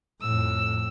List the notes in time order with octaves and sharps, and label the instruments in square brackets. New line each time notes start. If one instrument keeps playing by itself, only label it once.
[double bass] F2 A2 [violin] E6